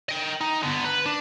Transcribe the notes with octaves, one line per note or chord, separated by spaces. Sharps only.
D#5 G5
D#4
D3 B3
B4
D4